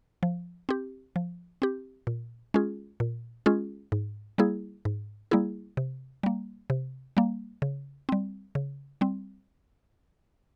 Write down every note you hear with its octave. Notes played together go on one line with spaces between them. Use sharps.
F3
C4 G4
F3
C4 G4
A#2
G#3 C#4 F4 G#4
A#2
G#3 C#4 F4 G#4
G#2
G3 A#3 E4 G#4
G#2
G3 A#3 E4 G#4
C3
G3 A#3
C3
G3 A#3
C#3
G3 C4
C#3
G3 C4